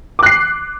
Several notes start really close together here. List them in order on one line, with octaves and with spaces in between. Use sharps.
D6 F#6 C7